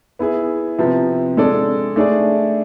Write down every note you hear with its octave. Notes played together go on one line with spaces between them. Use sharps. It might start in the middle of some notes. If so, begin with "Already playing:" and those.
B3 E4 G#4
C3 F3 B3
G#3 D4 A4 D5
A3 D4 G#4 D5